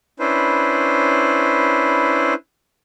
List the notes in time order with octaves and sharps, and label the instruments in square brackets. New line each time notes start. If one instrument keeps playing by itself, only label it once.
[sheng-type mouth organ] C#4 D4 E4 B4 C5